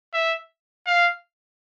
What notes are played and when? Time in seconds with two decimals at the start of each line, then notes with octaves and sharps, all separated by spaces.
0.13 E5
0.86 F5